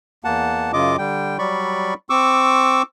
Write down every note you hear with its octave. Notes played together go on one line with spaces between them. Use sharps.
E2 A#3 F#5 A5
F#2 C#3 F4 D#5 D6
D3 G3 G5
F#3 G3 D5 B5 C#6
C4 C#6 D6 E6